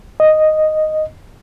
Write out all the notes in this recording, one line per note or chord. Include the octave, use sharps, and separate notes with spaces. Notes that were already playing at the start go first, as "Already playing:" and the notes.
D#5